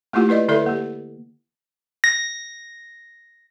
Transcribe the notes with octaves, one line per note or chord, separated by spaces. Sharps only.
A3 A#3 E4 F4 G4
E4 B4 D5 D#5
D3 E4 A4 B4 D5 E5
A#3 G4
A#6